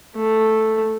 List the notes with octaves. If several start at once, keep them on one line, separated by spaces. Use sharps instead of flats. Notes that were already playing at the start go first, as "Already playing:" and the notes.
A3